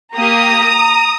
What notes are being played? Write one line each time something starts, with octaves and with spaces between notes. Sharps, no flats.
A#3 G4 A#5 D#6